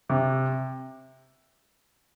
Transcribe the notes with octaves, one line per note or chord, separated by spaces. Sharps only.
C3